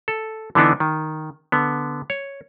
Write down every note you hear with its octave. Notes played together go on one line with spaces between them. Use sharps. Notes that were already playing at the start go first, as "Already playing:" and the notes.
A4
D3 E3 B3 D4 D#4
D#3
D3 B3
C#5